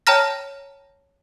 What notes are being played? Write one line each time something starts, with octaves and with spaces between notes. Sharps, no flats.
C#5 G5 A5 A#5 F6 A#6